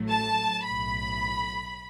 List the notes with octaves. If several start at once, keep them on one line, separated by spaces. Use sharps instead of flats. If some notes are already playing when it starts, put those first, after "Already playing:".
Already playing: A1 A2 F#3 A3
A5
B1 A2 F#3 B5